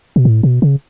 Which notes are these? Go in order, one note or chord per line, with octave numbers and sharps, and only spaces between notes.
B2
A2
B2
C#3